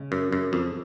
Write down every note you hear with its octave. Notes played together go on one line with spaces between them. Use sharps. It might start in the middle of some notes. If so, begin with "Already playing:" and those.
Already playing: C#3 G#3 C#4
F#2
F#2
F2